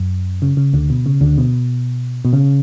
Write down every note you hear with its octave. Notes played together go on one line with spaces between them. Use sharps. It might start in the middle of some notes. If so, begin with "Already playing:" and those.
Already playing: F#2
C#3
C#3
D2 D3
B2
C#3
D2 D3
B2
B2
C#3